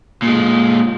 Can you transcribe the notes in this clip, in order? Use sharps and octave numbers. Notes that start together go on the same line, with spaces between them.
A#2 G#3